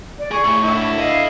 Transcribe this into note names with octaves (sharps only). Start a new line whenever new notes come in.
D5
G#4 C#6
A2
D3 E4
C#2 D#5 F5